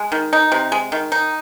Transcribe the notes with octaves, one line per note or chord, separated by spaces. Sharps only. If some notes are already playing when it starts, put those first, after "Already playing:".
Already playing: G#3
D#3
D#4
C3
G#3
D#3
D#4